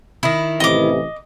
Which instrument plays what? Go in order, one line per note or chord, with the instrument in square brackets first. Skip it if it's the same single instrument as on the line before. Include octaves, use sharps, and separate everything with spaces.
[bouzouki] D#3 E4
[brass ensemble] A1 C3 E3 [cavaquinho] D#5 D6